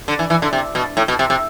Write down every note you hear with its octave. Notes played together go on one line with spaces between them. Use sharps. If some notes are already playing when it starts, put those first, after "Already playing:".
D3
E3
E3
D3
C3
B2
A2
B2
C3
C3